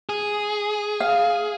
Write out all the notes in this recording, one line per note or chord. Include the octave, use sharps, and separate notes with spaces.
G#4
F5